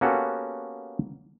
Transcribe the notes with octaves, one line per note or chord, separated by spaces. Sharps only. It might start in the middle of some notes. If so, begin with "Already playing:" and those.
A#3 B3 C#4 F#4 G4 A4